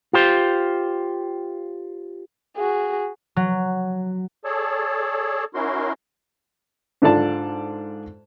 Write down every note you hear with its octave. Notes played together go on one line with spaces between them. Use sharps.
F4 G4 C5
F#4 G#4
F#3
G#4 A4 C#5 D5 A5
C#4 D#4 E4 F#4 A#4 C6
G#2 D4 F4 A4 D5 A5